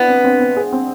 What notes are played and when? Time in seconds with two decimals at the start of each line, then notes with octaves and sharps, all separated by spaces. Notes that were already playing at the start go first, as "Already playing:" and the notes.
Already playing: B3 D4 E4
0.08 C4
0.24 C4
0.41 C4
0.56 G#4
0.73 C4